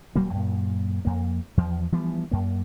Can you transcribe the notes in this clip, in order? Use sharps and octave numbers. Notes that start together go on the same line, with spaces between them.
D#1 F#3 G3 A#3
F#2 A#2
F2 A#3
E2 F3
E3 F3 G3 B3
F#2 A#3